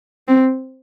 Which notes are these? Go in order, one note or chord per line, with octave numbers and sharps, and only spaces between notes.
C4